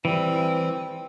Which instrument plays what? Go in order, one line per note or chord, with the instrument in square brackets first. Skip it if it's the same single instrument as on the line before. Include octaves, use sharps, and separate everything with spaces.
[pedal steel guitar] E3 [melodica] G3 C4